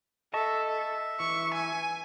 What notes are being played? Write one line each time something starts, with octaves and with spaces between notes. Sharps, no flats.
A4 D#5 E5 A5 C#6
E5
E3 C#6
G#5